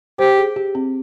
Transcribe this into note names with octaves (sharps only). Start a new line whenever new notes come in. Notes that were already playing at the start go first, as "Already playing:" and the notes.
G4 C5
G#4
G4
C4